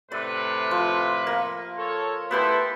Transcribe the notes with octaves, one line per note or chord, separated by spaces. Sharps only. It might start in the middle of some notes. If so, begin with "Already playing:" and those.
A2 C3 B4 D5
F3
A#3
A4 C#5
A3 B3 E4 G4 C6